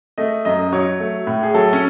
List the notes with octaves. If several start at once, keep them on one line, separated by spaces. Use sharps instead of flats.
A3 D#5
F#2 D#5
F#3 C#5
A3
A2
G#4
F#3 A4
C#4